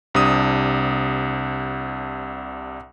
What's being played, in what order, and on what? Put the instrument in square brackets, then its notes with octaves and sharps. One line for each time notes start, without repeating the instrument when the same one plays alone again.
[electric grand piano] C2 C3 D4 D#6